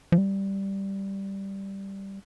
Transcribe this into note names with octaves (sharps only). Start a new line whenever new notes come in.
F3
G3